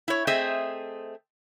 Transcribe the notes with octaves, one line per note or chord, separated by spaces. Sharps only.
E4 C#5
A3 C4 G#4 C5 D#5 E5